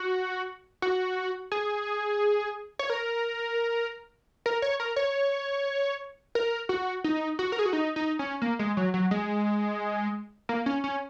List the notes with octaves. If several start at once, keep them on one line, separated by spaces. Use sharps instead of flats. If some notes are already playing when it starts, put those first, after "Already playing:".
Already playing: F#4
F#4
G#4
C#5
A#4
A#4
C#5
A#4
C#5
A#4
F#4
D#4
F#4
A#4
G#4
F#4
D#4
D#4
C#4
A#3
G#3
F#3
F#3
G#3
A#3
C#4
C#4